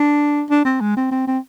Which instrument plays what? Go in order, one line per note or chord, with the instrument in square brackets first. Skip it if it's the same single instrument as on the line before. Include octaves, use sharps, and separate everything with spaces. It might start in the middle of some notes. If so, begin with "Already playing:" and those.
Already playing: [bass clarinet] D4
D4
C4
G#3
C4
C4
C4